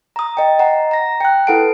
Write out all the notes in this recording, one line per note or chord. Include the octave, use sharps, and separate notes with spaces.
A#5 D#6
D#5 G5
D#5 F#5 A#5
A#5 A#6
G5 F#6
E4 A4 B4 F#5 A5 D7